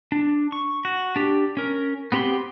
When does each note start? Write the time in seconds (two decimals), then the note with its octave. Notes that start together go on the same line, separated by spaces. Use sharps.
0.12 D4
0.52 C#6
0.85 F#4
1.16 D4 G4
1.57 C#4 A#4
2.12 B3 C4 G4 B5 C6